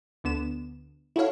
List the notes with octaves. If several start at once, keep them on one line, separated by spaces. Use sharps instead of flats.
D2 D3 B3 E7
E4 F#4 A4 C#5 F5